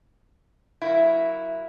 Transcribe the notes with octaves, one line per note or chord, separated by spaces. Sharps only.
F#3 A#3 E4